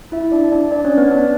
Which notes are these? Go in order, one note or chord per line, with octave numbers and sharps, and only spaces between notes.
E4 E5
D4 D5
D4 D5
D4 D5
C#4 C#5
B3 B4
D4 D5